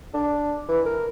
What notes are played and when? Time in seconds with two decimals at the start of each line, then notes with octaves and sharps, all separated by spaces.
0.14 D4
0.68 E3
0.85 A#4